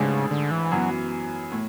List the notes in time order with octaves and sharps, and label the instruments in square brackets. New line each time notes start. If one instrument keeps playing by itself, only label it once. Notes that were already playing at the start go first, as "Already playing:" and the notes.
Already playing: [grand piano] A1 G#2 G#3 D4 [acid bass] C#3
[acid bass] D3
E3
[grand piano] F#2 E3 B3 [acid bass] F#3
[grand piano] A2